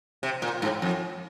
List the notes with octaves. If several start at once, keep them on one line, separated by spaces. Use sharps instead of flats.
C3
A#2
G#2
F2